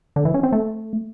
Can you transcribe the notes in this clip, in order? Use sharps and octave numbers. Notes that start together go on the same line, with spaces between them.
D3
E3
C#4
C4
A3